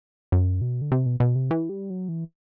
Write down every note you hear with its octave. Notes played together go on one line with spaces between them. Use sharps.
F#2
B2
D3
C3
B2
B2
C3
E3
G3
F#3
E3